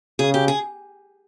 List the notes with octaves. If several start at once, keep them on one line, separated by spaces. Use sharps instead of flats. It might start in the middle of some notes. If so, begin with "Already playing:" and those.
C#3 G#4
G4
G#4